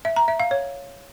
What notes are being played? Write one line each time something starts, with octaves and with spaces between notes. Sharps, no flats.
E5
A#5
E5
F5
C#5